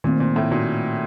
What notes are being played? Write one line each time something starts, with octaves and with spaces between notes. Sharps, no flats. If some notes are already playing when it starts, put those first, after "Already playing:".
A#2 D#3 A3 C4
A#2
A2
A#2 D#4 F#4